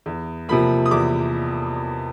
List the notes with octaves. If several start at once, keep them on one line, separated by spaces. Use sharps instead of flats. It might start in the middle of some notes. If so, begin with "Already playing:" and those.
E2
C3 F3 A#3 B5
D#6
E2 D6